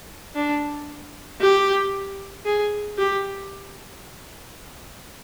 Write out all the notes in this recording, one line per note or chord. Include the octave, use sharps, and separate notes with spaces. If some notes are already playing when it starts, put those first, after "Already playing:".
D4
G4
G#4
G4